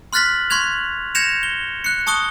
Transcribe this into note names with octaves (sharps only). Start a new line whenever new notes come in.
C6 F6 F#6 A6 B6 F#7
C6 C#6 F#6 G#6 F7
G6 G#6 A#6 C#7 E7 F7
G7
F#6 C#7
A5 C#6 D#6 F#6 G7